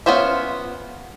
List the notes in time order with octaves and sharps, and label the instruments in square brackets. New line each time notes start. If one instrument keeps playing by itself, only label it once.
[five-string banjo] B3 C#4 F4 C5 E5